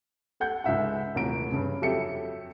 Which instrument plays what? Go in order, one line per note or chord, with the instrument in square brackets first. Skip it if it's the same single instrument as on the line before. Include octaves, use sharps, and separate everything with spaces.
[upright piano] A4 F#5 G6
C#2 G#2 E5 F#5
D#1 A1 C3 A#5 D7
G2 C#3
F2 F#3 G4 A4 E5 C#7